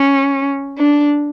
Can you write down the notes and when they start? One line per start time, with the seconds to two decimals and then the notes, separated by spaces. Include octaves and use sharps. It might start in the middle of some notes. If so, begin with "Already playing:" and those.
Already playing: C#4
0.78 D4